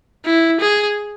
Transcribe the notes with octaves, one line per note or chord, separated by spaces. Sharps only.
E4
G#4